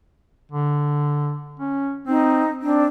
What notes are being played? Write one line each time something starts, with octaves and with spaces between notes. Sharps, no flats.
D3
C#4
C4 D#4
C4 D4